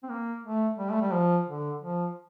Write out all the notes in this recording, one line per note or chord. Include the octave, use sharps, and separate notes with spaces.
C4
A#3
A3
G3
A3
G3
F3
D3
F3